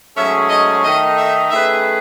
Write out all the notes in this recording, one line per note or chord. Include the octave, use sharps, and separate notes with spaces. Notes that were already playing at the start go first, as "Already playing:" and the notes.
G#2 F#3 A3 C#4 G#4 E5
D#5
D#3 A3 D#4 D#5
E5
D#3 A3 C#4 G#4 B4 E5